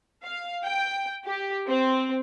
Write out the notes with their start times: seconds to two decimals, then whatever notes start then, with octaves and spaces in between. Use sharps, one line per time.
0.24 F5
0.64 G5
1.25 G4
1.69 C4